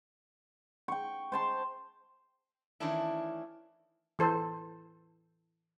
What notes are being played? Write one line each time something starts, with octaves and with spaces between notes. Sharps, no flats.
G5 C#6
C5 A5 C6
D#3 E3 A3 C#4 D4 E4
E3 A4 C5